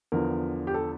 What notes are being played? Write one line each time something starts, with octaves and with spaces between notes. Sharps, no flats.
E2 D3 F3 A#4
G4
A4